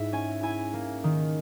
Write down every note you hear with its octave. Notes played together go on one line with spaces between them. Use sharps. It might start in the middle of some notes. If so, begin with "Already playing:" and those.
Already playing: G#2 E4 G#4 E5
C#4 G#5
E4 G#5
A#3
D#3